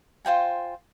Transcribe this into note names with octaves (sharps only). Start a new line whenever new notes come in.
F4 C5 G5 G#5